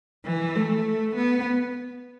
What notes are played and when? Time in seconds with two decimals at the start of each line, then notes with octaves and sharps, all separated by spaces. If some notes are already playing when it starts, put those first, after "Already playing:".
0.25 E3
0.55 A3
1.16 B3